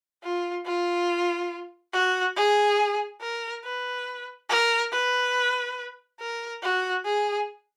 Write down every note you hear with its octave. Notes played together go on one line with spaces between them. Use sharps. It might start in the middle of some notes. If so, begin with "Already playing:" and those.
F4
F4
F#4
G#4
A#4
B4
A#4
B4
A#4
F#4
G#4